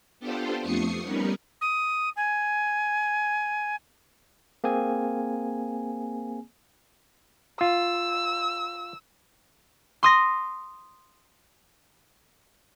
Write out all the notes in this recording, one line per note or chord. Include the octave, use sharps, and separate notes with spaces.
B3 D4 F4 G4 A4 C5
F2 A3 C#6 D#6 C7 C#7
G3 B3 C#4 D#4 A#4 B4
D#6
G#5
A#3 C4 G#4 G#5
F4 E6
C6 D#6 A#6